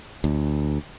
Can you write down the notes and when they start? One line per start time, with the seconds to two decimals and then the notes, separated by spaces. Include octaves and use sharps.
0.24 D2